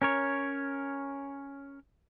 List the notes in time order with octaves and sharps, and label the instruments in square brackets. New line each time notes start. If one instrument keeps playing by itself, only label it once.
[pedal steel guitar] C#4 A#4 C#5